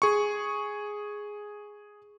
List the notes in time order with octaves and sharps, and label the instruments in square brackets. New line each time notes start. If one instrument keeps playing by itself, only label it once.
[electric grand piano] G#4 C#6